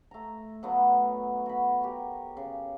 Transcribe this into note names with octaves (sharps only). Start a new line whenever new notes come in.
A3 A#5
F#3 A3 B3 D#4
F#4 B5
G4 A#4
C#3